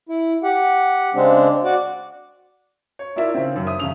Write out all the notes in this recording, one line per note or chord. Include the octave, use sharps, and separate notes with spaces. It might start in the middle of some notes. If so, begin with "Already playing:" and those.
E4
G4 F#5
C#3 G#3 C4 D4
F#4 D5
C#5
E4 F4 A#4 D5 E5
C#3 C4
F#2 D#3
E5 D#6
E1 C#3 C#4 F7